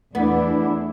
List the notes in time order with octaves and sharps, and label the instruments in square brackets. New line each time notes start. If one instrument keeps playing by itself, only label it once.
[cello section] E2 D4 [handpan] A3 [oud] B3 [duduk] E4